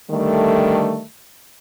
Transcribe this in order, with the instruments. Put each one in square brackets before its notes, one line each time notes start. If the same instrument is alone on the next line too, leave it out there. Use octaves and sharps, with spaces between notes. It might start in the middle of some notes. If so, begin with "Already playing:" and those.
[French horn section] D3 D#3 G3 A3